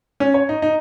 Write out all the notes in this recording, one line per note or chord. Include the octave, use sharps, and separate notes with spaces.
C#4
C#5
D#4
D#4